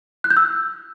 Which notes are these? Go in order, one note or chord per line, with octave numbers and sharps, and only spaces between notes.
F#6
G6
E6